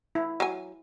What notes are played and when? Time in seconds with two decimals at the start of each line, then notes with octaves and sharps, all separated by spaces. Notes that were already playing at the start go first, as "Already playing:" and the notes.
0.15 E4
0.40 F#3 G#5